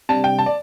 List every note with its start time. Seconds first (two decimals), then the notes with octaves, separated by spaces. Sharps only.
0.09 C3 G3 D4 A5
0.24 G5
0.39 A5
0.46 D5